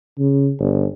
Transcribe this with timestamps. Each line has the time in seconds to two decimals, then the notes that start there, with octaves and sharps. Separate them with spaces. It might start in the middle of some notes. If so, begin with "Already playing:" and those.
0.18 C#3
0.59 G1